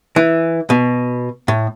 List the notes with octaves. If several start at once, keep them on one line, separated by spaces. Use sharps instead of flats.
E3
B2
A2